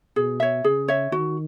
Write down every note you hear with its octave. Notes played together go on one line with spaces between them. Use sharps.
B2 G#4
C#5 E5
C#3 G#4
C#5 E5
D#3 F#4